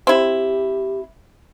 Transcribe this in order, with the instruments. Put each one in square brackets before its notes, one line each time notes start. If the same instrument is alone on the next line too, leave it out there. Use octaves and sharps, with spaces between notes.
[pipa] C4 E4 [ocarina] G4